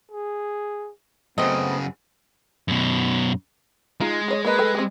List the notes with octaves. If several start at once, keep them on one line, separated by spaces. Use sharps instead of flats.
G#4
F#2 C#3 A3 B3 C4 D#5
F#2 B2
G#3 D#4 F4
G#4 C#5 D#5
A#3 A#4 B4 D#5
A4 G5
C4 G4